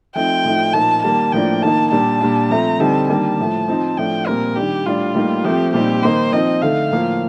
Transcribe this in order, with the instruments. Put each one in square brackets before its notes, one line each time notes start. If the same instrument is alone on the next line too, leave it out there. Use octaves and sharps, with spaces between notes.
[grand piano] F3 A3 C4 D#4 [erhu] G5
[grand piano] A2 F3 A3 D#4
[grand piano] A#2 F3 A#3 D#4 [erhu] A5
[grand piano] D#3 G3 A#3 [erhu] A5
[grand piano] A2 F3 A#3 D4 [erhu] G5
[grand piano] D#3 A#3 D#4 [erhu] A5
[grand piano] A#2 G3 D4 [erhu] A5
[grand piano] A#2 G3 D4
[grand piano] F3 A3 C4 [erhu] A#5
[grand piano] D3 G3 C4 D#4 [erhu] A5
[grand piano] D#3 G3 A#3 D4 [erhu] A5
[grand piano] A2 F3 A3
F3 C4 D#4
[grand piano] A2 F3 A3 D4 [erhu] G5
[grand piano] A#2 G3 C4 [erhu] A#4
[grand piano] D#3 G3 D4 [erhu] G4
[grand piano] A2 G3 D4 [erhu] F4
[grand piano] A2 G3 A#3 D#4
[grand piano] F3 A3 C4 [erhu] G4
[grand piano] A#2 G3 C4 D#4 [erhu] G4
[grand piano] D#3 A#3 D#4 [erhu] C5
[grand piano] F3 C4 D#4 [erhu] D#5
[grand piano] D3 A3 D#4 [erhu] F5
[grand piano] A2 F3 A#3